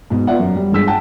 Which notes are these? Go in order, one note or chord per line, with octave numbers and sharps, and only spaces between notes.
G#2 B2
B3 F4 D5 E5 F#5
F#2
G3
G1 G#3 E6 B6
F#5 G5 A5